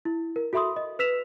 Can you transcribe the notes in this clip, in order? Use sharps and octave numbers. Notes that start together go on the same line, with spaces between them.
E4
A#4
F#4 A4 E5 B5 C6 D#6
D#5
B4 E6 B6 E7 F7